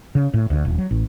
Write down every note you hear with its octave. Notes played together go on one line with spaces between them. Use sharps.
C#3
A2
D2
D#1
F#3
A1